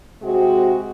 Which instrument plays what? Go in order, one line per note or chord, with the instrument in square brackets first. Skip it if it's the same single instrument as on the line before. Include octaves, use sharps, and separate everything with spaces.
[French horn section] C3 G#3 C4 F#4